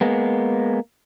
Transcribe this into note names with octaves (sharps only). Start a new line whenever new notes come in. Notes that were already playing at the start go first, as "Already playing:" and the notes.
G#3 A#3 B3